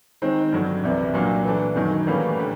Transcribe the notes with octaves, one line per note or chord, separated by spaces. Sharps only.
D#3 G#3 C4
G2 D3 F#3
C2 C3 E3
A#2 F#3 A#3 D4
E3 A3 D4
F#2 D#3 F#3
A2 E3 G3 A#3 C#4
D3 G3